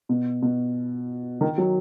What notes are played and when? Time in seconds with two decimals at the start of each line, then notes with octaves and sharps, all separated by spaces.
0.09 B2
0.42 B2
1.41 D#3
1.58 F#3